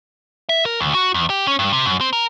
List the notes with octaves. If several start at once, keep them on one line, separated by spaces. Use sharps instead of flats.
E5
A#4
D2
F#4
E2
G4
C#4
G2
C3
F#2
C4
A#4